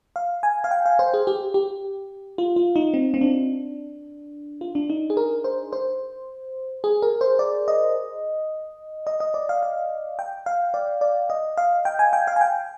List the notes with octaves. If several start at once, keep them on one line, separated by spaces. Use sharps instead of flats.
F5
G#5
F5
G5
F5
C5
G#4
G4
G4
F4
F4
D#4
C4
C4
D4
F4
D4
D#4
G#4
A#4
C5
C5
G#4
A#4
C5
D5
D#5
D#5
D#5
D5
F5
F5
G5
F5
D5
D5
D#5
F5
G5
G#5
G5
F5
G#5
G5